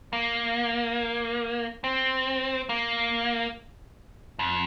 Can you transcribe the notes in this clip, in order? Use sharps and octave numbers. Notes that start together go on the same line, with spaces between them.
A#3
C4
A#3
F2